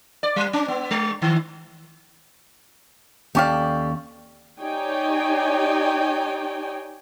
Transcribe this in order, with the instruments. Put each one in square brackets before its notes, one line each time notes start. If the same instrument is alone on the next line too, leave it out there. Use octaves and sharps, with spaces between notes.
[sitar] D5
G3
C#4
B3
G#3
D#3
[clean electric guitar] D#2 C#4 F5 [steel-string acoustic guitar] G4 A4 D5
[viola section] D#4 G4 C#5 D5 G5 G#5